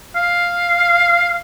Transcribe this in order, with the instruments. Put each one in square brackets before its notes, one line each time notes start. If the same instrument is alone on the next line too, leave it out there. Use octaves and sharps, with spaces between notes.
[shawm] F5